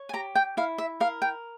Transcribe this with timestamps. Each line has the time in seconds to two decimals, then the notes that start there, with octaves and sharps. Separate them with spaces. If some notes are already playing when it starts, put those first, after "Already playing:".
Already playing: C#5
0.09 G#5
0.13 G4 A#5
0.35 G5
0.57 E4 F5
0.78 E5
1.00 A#4 F5
1.22 G5